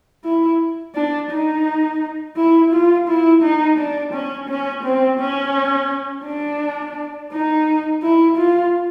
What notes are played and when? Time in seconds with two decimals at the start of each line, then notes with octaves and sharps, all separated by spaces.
0.24 E4
0.95 D4
1.31 D#4
2.36 E4
2.73 F4
3.08 E4
3.43 D#4
3.78 D4
4.13 C#4
4.49 C#4
4.84 C4
5.20 C#4
6.25 D4
7.32 D#4
8.03 E4
8.37 F4